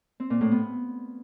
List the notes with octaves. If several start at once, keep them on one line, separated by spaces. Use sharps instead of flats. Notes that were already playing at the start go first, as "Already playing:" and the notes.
C4
A#2
A2
B3